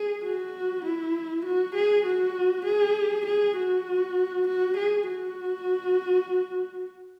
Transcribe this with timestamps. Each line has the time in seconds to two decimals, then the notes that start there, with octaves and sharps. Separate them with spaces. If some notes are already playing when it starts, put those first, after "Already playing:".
Already playing: G#4
0.23 F#4
0.85 E4
1.45 F#4
1.75 G#4
2.05 F#4
2.65 G#4
3.26 G#4
3.57 F#4
4.48 F#4
4.77 G#4
5.08 F#4